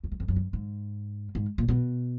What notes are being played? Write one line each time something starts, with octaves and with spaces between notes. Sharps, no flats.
F2
E2
F2
F#2
G2
G#2
G#2
A#2
B2